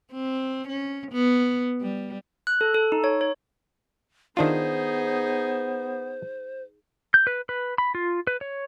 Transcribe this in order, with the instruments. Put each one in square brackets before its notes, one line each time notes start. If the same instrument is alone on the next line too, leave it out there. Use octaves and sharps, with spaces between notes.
[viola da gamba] C4
C#4
B3
G3
[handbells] F#6
A4
A4
D#4
C#5
C#5
[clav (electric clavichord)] D#3 D4 F4 [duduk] B3 [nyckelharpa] D#4 G#4 [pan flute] C5
[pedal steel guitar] G6
B4
B4
B5
F4
B4
C#5